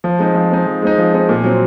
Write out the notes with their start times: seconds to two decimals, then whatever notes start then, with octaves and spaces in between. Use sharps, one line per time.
0.04 F3
0.19 G#3 C4 D#4
0.35 F3
0.50 G#3 C4 D#4
0.67 F3
0.82 G#3 C4 D#4
0.98 F3
1.13 G#3 C4 D#4
1.29 A#2
1.44 F#3 C4